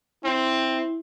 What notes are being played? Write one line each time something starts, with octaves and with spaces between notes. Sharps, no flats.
C4 E4